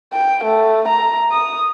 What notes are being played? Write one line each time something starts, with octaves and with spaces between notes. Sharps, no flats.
G5
A3
A#5
D#6